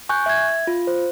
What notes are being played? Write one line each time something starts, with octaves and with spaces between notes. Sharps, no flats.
G#5 C#6 F#6 G6
E5 G#6
F4
C5